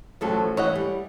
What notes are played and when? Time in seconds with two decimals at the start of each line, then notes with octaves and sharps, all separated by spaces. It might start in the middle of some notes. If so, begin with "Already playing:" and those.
0.21 A1 F3 F#3 A3 A4
0.57 E3 C#5 D#5 F#5
0.75 G3